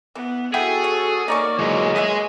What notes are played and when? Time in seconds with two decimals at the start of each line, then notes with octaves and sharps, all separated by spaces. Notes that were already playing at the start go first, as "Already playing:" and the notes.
0.15 E3 B3
0.54 E4 F#4 G#4 A4 F#5 G5
0.84 C#5
1.28 A#3 D#4 C#5 D5 C#6
1.59 E3 F#3 G#3
1.96 B4 C#5 D#5 E5 G#5